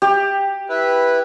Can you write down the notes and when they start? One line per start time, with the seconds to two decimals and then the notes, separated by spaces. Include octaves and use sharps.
0.02 G4
0.69 E4 B4